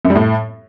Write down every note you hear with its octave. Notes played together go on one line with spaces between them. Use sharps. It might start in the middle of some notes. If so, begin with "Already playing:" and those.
F#2
G3
A2